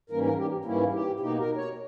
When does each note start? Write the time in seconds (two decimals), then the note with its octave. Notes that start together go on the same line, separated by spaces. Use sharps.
0.10 G#2 E3 G3 A#3 C#4 A#4
0.24 A#4
0.37 G4
0.65 G#2 E3 G3 A#3 C#4 E4
0.93 G4
1.19 B2 A#3 D#4 G4
1.38 A#4
1.56 C#5